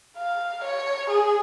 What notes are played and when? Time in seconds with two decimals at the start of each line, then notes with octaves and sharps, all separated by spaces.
0.18 F5
0.64 C#5
1.10 G#4